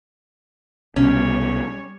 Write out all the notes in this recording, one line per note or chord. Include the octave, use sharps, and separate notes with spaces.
C2 B2 G3 C#4 C#5